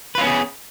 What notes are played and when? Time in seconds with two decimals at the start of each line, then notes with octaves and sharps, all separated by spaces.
0.15 B4
0.18 F4
0.21 C#4
0.24 B3
0.27 G#4